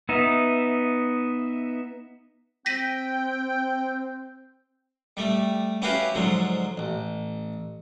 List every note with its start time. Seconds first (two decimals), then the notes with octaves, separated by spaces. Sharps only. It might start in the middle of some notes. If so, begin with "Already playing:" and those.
0.09 B3 D#4 E5
2.66 C4 G5 A#6 B6 D#7
5.17 G3 A3
5.82 C#4 E4 F#4 G4 B4 F5
6.14 G#2 D3 F3 F#3
6.77 A1